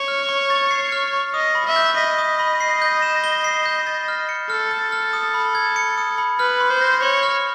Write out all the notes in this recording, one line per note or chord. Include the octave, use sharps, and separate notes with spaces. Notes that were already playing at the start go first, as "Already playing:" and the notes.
Already playing: C#5
F6
C#6
A6
C7
F6
C#6
D#5 D#6
B5
E5
G6
D#5 B6
D#6
B5
C7
G6
E7
G7
C7
G6
A6
F6
C#7
A4 F6
A6
F6
D#6
B5
G#6
C#7
D#6
B5
B4 F6
C6
C5
A#6
C#5 C6
F6